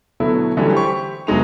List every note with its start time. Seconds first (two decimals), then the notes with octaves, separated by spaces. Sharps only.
0.20 B2 D3 F#3 A3 B3 E4
0.57 D3 E3 F#3 G3 A3 C#4
0.73 G4 C5 B5 C#6
1.27 F1 B2 F#3 G#3 D#4 F7